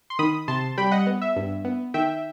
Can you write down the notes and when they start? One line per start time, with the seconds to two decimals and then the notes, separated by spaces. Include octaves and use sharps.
0.10 C6
0.19 D#3 B5 D#6
0.48 C3 A5 C6
0.77 G3 G5 B5
0.91 D#5 F#5
1.07 B3
1.22 E5
1.36 G2
1.65 B3
1.94 D#3 E5 G5